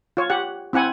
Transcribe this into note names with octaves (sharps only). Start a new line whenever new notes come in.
F4 C#5
G4 F#5
C4 E4 F#5 G#5